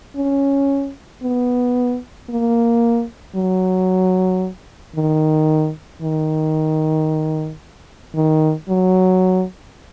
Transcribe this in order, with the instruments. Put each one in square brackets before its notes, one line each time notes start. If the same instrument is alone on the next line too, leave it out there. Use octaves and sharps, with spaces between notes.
[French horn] C#4
B3
A#3
F#3
D#3
D#3
D#3
F#3